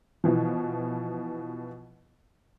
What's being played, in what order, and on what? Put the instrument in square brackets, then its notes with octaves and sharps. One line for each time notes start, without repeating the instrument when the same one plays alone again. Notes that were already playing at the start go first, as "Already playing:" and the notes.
[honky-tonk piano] B2 E3 F3